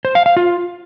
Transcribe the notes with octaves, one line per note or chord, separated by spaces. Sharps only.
C5
F5
F5
F4